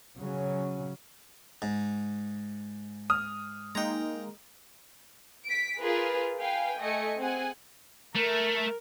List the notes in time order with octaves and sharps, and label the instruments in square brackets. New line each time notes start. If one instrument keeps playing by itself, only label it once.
[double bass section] C#3 F#3 C#4
[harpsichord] G#2
[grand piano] D#6 F6
[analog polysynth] G#3 A#3 D#4 [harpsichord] G5 A#5
[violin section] B6 D7
F4 G#4 A#4 B4
B4 F5 G5 G#5
A3 D#5 G#5 C#7
C4 G#4 F#5 G#5
[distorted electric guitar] A3 [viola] A#4